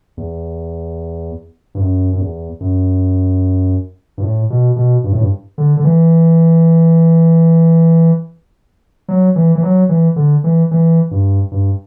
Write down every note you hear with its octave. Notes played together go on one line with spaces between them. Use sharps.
E2
G2
F#2
F#2
E2
F#2
G2
A2
B2
B2
G2
A2
G2
D3
D3
E3
F#3
E3
E3
F#3
E3
D3
E3
E3
G2
G2